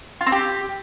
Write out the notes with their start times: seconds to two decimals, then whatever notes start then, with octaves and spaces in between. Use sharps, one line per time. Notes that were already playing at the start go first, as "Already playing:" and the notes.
0.21 F4
0.26 C4
0.32 G4